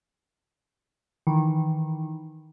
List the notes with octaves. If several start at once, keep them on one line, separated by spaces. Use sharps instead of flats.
D#3 E3